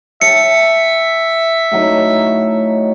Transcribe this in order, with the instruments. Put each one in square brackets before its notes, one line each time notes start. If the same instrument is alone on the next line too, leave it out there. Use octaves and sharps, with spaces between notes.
[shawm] E5 [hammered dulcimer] G5 A5 [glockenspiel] C#7
[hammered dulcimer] A2 F#3 D#4